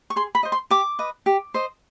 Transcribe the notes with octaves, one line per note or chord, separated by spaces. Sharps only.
C#6
G#4 C6
B5
C5 D#5
C6
G4 D6
B4 D#5
G4
C5 D#5